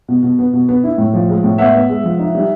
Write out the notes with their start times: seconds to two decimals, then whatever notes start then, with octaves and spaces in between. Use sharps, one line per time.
0.08 B2
0.23 B2
0.39 B3
0.53 B2
0.69 B3
0.84 E4
0.98 A2
1.14 F3
1.29 G#3
1.44 A2
1.58 B3 E5 F#5
1.74 B3
1.89 G#3
2.04 F3
2.19 D#4
2.35 G3